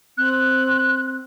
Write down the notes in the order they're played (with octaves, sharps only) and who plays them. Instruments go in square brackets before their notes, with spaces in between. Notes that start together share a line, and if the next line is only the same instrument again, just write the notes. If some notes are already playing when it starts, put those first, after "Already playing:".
[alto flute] C4 [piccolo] F#6